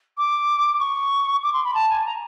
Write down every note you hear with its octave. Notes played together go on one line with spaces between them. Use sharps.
D6
C#6
D6
C6
B5
A5
G#5
A#5